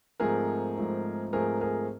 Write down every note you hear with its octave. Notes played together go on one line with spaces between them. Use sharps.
G#2 F3 A3 C4 G#4 A#4
G#2 F3 A3 C4
G#2 F3 A3 C4 G#4 A#4
G#4 A#4